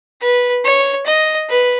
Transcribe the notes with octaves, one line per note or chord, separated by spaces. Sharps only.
B4
C#5
D#5
B4